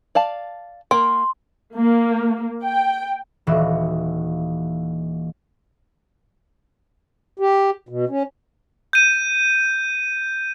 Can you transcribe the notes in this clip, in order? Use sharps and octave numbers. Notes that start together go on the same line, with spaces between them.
D5 F5 A5
A#3 A#4 G5 C6
A#3
G5
D#1 E3 F#4
G4
B2
C#4
G6 D#7